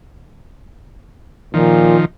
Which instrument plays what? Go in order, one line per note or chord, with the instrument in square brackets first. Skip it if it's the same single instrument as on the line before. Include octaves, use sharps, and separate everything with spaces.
[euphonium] A#2 [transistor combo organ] D#3 F3